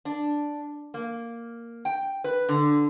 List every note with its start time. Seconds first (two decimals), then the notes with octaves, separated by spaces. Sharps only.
0.05 D4
0.94 A#3
1.85 G5
2.24 B4
2.49 D3